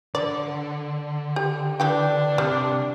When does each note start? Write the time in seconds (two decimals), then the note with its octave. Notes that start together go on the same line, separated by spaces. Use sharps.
0.15 D3 D5
1.36 G4
1.80 E3 D4 G4 G5
2.38 C3 G3